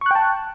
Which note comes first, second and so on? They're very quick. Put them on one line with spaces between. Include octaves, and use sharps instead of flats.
C#6 F#6 G5 A5